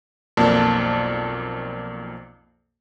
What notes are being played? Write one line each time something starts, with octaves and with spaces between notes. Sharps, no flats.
B1 F2 A#3 D5 A5